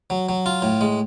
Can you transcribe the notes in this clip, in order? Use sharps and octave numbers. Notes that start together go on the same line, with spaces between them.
F#3
F#3
F4
A2
G#3